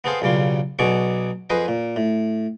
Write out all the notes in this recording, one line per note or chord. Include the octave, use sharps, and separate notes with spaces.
B3 C4 G#4 A4 C5 F5
B1 C#3 G3 F4
B1 B2 G#4 D5 C#6
F2 G#4 B4 C5 D#5 G#5
A#2
A2